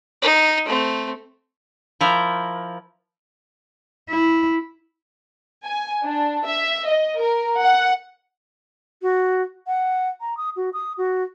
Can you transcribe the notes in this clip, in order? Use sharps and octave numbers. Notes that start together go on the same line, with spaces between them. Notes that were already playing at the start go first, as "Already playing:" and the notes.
D#4
A3 C4
F3 E4 A#4
E4
G#5
D4
E5
D#5
A#4
F#5
F#4
F#5
A#5
D#6
F#4
D#6
F#4